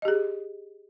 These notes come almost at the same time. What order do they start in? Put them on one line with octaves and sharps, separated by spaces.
D#5 G4 G#4